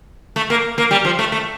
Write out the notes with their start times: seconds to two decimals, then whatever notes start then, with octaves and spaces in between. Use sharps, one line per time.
0.36 A3
0.50 A#3
0.78 A#3
0.91 G3
1.05 F3
1.19 A3
1.32 A3